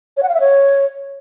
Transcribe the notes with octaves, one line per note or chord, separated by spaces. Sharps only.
C#5
F#5
F5
E5
C#5